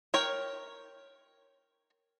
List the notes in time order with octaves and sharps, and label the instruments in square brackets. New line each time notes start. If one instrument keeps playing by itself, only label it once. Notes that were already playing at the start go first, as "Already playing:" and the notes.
[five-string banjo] A#4 C#5 G5